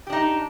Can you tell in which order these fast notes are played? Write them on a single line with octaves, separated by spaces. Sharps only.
G4 D4 D#4